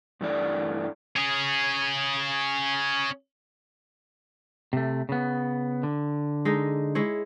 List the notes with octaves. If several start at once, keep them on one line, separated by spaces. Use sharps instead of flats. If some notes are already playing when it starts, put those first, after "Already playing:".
G2 E3 A3 D4 D5
C#4 G#4
C3 A3
C#3 B3
D3
G#3 D#4 A4
G#3 E4 C#5